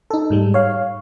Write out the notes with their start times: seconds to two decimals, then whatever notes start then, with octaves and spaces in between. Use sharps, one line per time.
0.10 D#4 A4
0.30 G#2 G3 G#3
0.54 C#5 F5